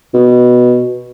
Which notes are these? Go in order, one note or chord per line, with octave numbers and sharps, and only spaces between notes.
B2